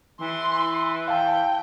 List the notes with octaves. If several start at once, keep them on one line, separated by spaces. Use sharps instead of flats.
E3 C6
F5 G5 A5